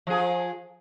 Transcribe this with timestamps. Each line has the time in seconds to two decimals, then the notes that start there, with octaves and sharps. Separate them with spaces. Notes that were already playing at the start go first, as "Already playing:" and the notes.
0.07 F3 G#4